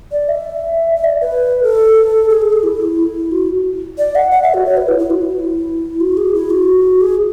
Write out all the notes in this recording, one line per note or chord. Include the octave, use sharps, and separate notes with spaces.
D5
E5
E5
D5
B4
A4
G#4
A4
G#4
E4
F#4
D5
F#5
F#5
E5
F#4
C#5
B4
E4
E4
F#4
E4
F#4
G#4
E4
F#4
G#4